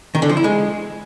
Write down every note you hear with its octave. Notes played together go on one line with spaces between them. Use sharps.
D#3
D3
F3
E4
G#3